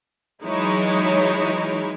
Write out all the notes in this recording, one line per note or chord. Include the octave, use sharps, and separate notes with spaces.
E3 F#3 G#3 D#4 E4 C#5